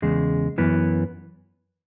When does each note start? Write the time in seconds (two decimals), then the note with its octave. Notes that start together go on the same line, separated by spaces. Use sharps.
0.02 E2 C#3 G#3
0.58 F#2 E3 B3